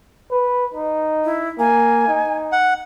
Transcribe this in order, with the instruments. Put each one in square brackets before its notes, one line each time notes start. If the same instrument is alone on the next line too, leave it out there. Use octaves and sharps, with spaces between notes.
[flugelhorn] B4
D#4
[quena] E4
[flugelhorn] A#3 [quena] G#5
[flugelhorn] D#4
[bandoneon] F#5